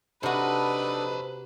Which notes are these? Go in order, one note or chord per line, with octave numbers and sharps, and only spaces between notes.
C3 D4 D#4 F#4 A4 B4 C5 B5